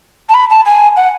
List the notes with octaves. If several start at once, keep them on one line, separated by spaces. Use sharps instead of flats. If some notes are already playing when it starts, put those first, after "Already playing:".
A5
B5
A5
G#5
F#5